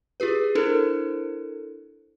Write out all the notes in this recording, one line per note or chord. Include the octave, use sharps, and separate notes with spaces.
F4 G4 G#4 B4
D4 E4 A4 A#4 C5